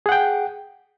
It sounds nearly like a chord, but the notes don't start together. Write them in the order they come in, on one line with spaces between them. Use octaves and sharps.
G#4 F#5 G5